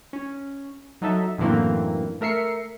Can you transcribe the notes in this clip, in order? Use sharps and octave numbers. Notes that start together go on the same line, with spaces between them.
C#4
F#3 D#4 A4 E5
F#2 A2 D3 E3 A#3 C4
A3 A#4 E5 C7 C#7